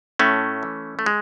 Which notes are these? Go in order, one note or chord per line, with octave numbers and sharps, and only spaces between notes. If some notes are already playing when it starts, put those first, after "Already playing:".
A2 A3 C#4
E3
A3
G#3